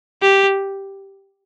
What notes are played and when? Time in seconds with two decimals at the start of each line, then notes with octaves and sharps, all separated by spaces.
0.22 G4